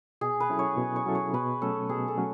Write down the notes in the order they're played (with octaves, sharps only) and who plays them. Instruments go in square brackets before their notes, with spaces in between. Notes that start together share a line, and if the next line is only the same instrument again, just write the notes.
[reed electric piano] B2 [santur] G#4
[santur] B4
[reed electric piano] F#3 C#4 E4 A4
[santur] C#5
[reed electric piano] B2
[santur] C#5
[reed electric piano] F#3 C#4 E4 A4
[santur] C#5
[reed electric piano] B2 [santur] B4
[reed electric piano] F#3 A3 C#4 [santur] A4
[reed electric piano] B2 [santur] G#4
[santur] A4
[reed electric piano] F#3 A3 C#4